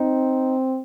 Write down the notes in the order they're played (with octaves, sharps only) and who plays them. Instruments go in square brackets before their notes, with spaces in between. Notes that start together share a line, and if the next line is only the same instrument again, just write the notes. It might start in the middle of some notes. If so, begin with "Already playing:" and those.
Already playing: [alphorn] C4 [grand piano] D#4